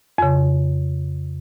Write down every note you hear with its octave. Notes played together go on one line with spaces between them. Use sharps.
F2 C#3